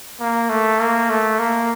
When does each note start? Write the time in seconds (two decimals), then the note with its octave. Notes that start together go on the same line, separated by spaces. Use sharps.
0.20 A#3
0.50 A3
0.80 A#3
1.10 A3
1.39 A#3